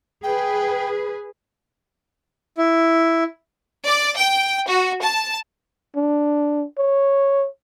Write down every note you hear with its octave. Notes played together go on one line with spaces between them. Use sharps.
G#4 B4 G5
E4
D5
G5
F#4
A5
D4
C#5